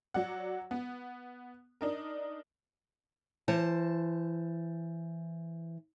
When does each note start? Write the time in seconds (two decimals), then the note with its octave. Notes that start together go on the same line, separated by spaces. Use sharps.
0.14 F#3 D5 F#5
0.71 B3
1.81 D4 D#4 A#4
3.48 E3 C5 A5